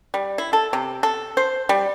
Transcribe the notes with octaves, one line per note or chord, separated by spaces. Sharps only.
G3
E4
A4
C3
A4
C5
G3